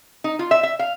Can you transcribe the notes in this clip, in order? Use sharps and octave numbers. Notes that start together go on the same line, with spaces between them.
D#4
F4
E5
E5
F5